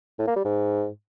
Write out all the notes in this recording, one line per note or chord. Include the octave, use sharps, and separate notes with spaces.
A2
A#3
G3
G#2